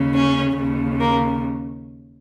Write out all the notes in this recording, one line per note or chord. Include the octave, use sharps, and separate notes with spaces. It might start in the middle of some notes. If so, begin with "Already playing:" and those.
Already playing: D#2 C#3
C#4
D#2 C#3
A#3